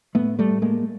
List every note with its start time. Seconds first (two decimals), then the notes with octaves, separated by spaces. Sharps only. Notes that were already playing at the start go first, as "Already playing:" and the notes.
0.15 A2 A3 B3
0.39 G3 A3
0.50 A2
0.62 G#3 A#3